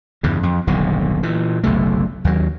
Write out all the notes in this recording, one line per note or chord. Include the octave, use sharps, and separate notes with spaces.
E2 G2 C#3
F2
D#1 B1 A2 D3
A#2 E3
F#1 B1 C3 A3
D#2 F#3